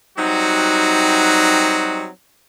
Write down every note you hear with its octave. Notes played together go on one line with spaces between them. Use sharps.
F#3 G3 C4 D#4 F#4